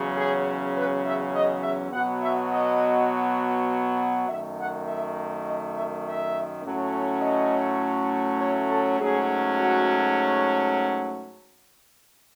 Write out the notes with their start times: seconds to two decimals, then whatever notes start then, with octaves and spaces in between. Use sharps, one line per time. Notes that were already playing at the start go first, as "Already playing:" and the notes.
Already playing: E2 C#3 F#3 C#4
0.15 G#4
0.74 B4
1.03 E5
1.33 D#5
1.62 E5
1.91 B2 F#3 B3 F#5
2.21 E5
2.50 D#5
4.27 F#2 D#3 A3 E5
4.57 F#5
4.86 E5
5.45 D#5
5.74 E5
6.04 E5
6.63 A2 F#3 A3 C#4
7.22 D#5
8.40 C#5
8.69 A4
8.99 G#2 F#3 A3 C#4 G#4
9.58 F#4